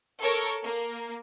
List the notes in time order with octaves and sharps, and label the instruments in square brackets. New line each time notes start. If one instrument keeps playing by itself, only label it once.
[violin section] A4 A#4 C#5 A5
A#3